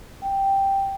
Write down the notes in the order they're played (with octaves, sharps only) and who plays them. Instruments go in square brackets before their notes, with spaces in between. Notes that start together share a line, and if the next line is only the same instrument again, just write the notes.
[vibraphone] G5